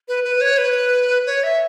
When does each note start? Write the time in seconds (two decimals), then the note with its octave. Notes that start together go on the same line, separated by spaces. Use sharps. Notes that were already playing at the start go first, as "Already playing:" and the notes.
0.08 B4
0.24 B4
0.41 C#5
0.58 B4
1.26 C#5
1.44 E5